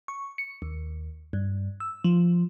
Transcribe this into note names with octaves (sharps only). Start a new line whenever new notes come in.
C#6
C#7
D#2
G2
E6
F3